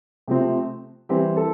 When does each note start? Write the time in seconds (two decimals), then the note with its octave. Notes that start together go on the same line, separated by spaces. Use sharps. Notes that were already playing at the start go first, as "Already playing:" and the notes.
0.28 C3 F3 A3 C4
1.09 E3 G3 C4 G4
1.37 A4